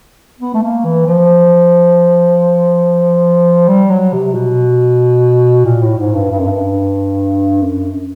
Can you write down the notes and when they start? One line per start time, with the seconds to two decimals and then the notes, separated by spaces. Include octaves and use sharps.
0.40 B3
0.54 A3
0.63 A#3
0.85 E3
1.06 F3
3.68 G3
3.90 F#3
4.13 C3
4.34 B2
5.65 A#2
5.82 A2
5.99 G#2
6.14 G2
6.32 G2
6.39 F#2
6.47 G2
7.62 F#2